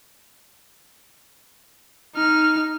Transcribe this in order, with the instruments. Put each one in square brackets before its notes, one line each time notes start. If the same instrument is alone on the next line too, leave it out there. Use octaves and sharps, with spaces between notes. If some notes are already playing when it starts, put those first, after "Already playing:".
[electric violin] D#4 F6